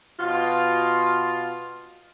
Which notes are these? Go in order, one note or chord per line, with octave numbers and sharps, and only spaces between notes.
B2 F4